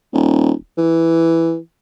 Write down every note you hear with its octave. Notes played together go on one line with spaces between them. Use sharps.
D#1
E3